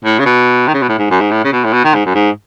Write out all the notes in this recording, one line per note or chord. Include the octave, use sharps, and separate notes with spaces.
A2
C#3
B2
D#3
C#3
B2
A2
G#2
F#2
G#2
A2
C#3
B2
A2
B2
D#3
G#2
F#2
G#2